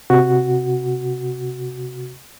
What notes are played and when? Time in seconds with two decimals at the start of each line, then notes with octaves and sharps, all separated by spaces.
0.10 C3 F#4